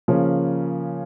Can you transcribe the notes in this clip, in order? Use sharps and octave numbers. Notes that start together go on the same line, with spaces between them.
C#3 F3 A#3 C#4